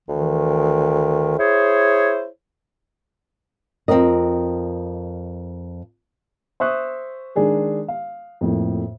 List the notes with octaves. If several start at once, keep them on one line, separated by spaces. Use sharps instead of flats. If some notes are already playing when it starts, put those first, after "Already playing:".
D2 D#3 E3
E4 G#4 C5 C#5
F2 C4 G4 A#4 D#5
C5 E5 C#6 D#6 F#6
D#3 G#3 D4 G#4 A#4
F5
F2 A2 A#3